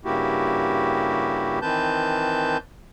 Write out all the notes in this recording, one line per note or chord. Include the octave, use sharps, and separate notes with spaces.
G2 C#3 A#3 E4 F#4 G4
D#3 E3 C4 B4 A5 G6